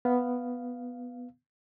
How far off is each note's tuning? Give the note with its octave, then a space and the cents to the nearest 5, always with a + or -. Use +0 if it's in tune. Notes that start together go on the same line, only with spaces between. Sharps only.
B3 +0 F5 +0